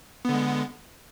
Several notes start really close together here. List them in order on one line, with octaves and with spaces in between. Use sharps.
B3 D3 G#3